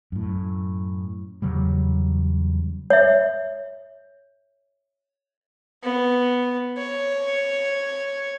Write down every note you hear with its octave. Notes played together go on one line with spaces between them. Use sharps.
F#2 A2
E2 C#3 F#3 G3
C#5 E5
B3
C#5